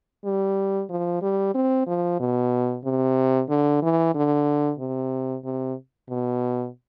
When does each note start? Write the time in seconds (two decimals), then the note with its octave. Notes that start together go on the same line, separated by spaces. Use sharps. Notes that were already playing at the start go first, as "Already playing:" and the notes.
0.24 G3
0.90 F3
1.22 G3
1.54 C4
1.87 F3
2.20 B2
2.84 C3
3.49 D3
3.82 E3
4.14 D3
4.79 C3
5.44 C3
6.09 B2